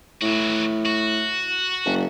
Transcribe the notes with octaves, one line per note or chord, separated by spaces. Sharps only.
A2 E3 F#4
F#4
F#1